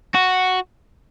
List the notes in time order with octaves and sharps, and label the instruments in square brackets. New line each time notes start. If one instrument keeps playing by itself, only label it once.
[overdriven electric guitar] F#4